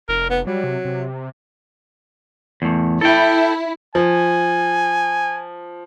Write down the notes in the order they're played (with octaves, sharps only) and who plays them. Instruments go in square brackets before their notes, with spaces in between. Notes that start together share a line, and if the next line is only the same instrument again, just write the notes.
[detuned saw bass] F1 [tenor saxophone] A#4
[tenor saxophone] B3
[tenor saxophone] F#3 [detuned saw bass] G3
[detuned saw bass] C3
C3
[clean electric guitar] E2 A3
[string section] E4 [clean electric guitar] A4 G5
[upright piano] F3 [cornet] G#5